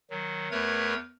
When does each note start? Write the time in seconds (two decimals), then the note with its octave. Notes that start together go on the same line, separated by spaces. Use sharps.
0.10 D#3 F#3
0.51 E2 A3 A#4 B4 C#5 G#6